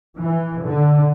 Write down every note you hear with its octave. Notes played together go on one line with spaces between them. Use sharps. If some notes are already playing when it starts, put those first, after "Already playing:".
E3
D3